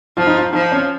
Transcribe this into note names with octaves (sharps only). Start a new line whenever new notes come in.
F3 F4
D#4
F4
F3 D#4
C#4